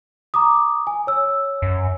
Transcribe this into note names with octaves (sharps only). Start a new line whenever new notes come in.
A#5 D6 D#6
G#5
C#5 E6
F#2